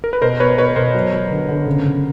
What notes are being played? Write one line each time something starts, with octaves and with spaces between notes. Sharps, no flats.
A#4
B4
B2 A#4 C5
B2 B4 C#5
B2 B4 C#5
B2 A#4 C5
F#3
F#3
D3
D3
C#3
C#3